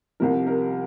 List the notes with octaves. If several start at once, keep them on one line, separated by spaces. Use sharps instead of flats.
C2 C3 F3 A#4
A#4